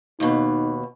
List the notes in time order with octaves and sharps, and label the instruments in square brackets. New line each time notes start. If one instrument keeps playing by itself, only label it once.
[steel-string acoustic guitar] D#2 B2 [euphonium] D#4